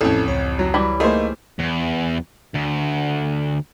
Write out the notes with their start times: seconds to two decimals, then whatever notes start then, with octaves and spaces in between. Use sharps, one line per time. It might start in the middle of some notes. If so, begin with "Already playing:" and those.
0.01 A1 F2 C#4 E4 A4
0.27 C#2 C#5
0.59 F#3
0.74 E3 G3 B5
1.00 A3 A#3 D#4 G#4 C5
1.59 E2
2.54 D2